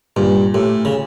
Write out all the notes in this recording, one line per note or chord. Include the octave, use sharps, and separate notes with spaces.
G2 A#2
A2 G4
C#3